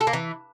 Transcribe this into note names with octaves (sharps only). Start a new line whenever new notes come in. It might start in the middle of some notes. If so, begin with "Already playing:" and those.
A4
A#3
E3